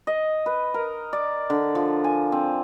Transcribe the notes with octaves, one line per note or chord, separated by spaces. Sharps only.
D#5
B4
A#4
D5
D3
F3
G#5
C4